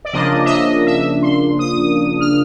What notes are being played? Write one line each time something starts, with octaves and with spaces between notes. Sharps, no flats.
D5
C#3 F3 A#3 D4 D#5
E5
D#5
E5
C6
D#6
F6